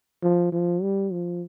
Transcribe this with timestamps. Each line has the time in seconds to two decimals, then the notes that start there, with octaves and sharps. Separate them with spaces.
0.23 F3
0.52 F3
0.82 G3
1.12 F3